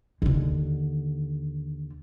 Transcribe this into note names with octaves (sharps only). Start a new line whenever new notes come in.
D#2 D3